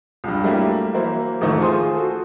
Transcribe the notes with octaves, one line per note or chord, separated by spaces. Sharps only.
C#2 G2
F#3 G3 A3 A#3 E4 G4
E3 F#3 A#3 E4 C5
A1 F2 D#3 F3 A3 C#6
F4 G#4 C5 C6 D#6
F#4 A4